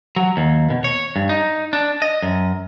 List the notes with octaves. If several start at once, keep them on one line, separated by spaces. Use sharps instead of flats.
F#3
D#2
B2
C#5
G2
D#4
D4
D#5
F#2